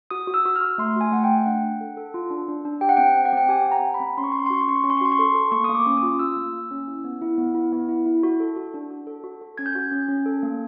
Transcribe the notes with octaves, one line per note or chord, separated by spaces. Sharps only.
F#4 D#6
F#4
E6
F#4
F6
F#4
A3 C6
F#4 G#5
A3 F#5
G5
A3
D4 F#5
D4
A4
A4
F4
D4
D4
D4
G4 G5
F#5
C4 G5
C4
F#5
C4 G5
G4 G#5
C4
A#5
C4
B5
C4
C#4 C6
C#6
C#4 C6
C#6
C6
F#4 C#6
C6
C#4 C#6
C6
C#4 C#6
C6
C#6
F#4 C6
C#6
A4 C6
A4
A#3 C#6
A#3 D#6
D6
C#4
D#6
F4
F4 E6
A#3
A#3
C#4
E4
B3
E4
B3
E4
B3
E4
E4
F#4
A4
F#4
D4
F#4
A4
F#4
A4
C#4 G#6
G6
F#4 G#6
C#4
C#4
A4
A#3